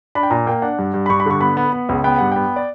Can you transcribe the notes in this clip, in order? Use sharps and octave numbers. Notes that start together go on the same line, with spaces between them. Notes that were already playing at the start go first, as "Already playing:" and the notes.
D4 B5
G5
A#2 A#5
A#3 G5
D4 F#5
G2
G2
B5
G2 C#6
B5
D3 C#6
B3 B5
B3
B3
C#2
B3 G5
G2 F#5
B3 G5
D5